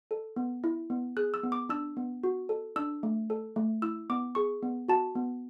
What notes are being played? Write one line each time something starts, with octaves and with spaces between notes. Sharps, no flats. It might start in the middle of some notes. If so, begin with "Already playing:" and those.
A4
B3
E4
B3
G#4 F#6
E6
B3
D6
D4 E6
B3
F#4
A4
D4 E6
A3
A4
A3
E4 E6
B3 D6
G#4 C#6
B3
F#4 A5
B3